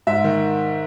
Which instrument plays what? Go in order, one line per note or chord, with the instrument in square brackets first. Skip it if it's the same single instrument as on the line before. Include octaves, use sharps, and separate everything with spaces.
[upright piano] G#2 E5
D#3